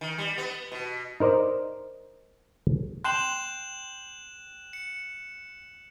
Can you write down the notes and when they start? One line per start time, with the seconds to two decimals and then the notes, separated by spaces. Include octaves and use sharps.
0.01 D#3
0.18 G3
0.38 B3
0.72 B2
1.20 D#4 A#4 C5 D5 D#5
3.04 G5 C6 F#6 E7 F#7
4.73 C#7